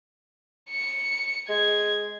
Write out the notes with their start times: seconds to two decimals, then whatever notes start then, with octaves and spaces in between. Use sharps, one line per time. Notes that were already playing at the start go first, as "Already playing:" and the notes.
0.70 C#7
1.49 G#3 G#6